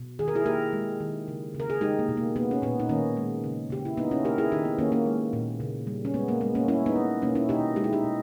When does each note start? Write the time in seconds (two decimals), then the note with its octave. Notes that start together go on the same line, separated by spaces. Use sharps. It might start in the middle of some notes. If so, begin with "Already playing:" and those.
Already playing: B2
0.19 D#3 G#4
0.28 A#4
0.35 E4 G#4
0.46 A#3 G4 A#4
0.73 G#3
1.00 D#3
1.28 C#3
1.55 C#3
1.60 A#4
1.70 G#4
1.81 G#3 D#4 G4
1.99 A#3
2.09 B2
2.17 A#3
2.36 A#3 B3
2.51 C#4
2.62 A#2 B3
2.80 D#4
2.89 D#3 A#3 C#4
3.17 G#3
3.44 C#3
3.70 C#3 G4
3.85 E4
3.97 A#3 B3 D#4
4.11 C#4 E4
4.25 A#3 G4 A#4
4.38 E4 G#4
4.52 D#3 D#4 G4
4.65 B3
4.78 D#3 A#3 C#4
4.92 A#3 C#4
5.06 G#3
5.33 A#2
5.60 C#3
5.87 G3
6.05 C#4
6.14 G#3 B3
6.28 A#3
6.41 G#3 B3
6.55 A#3 C#4
6.68 G3 C#4 E4
6.86 B3 D#4
6.96 A#3
7.22 B2 A#3 C#4
7.35 C#4 E4
7.49 B2 D#4 G4
7.76 G#3 G4
7.84 E4
7.93 D#4 G4
8.04 B2